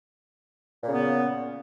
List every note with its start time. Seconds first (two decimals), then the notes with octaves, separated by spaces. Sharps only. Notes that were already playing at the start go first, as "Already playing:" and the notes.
0.83 A#2
0.87 C#3
0.92 B3